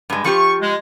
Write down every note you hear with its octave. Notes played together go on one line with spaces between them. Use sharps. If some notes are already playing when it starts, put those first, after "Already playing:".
G2 G#3
F3 F4 G4 C#6
G#3